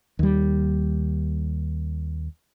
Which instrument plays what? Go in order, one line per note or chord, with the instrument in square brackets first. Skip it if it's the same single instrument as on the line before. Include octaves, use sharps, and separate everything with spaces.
[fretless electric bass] D#2 G3